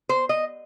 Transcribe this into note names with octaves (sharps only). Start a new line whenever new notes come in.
C5
D#5